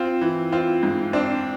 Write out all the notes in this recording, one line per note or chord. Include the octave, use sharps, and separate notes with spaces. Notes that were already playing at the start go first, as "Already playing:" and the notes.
Already playing: C4 F4
E3
C4 F4
G#2
C4 D4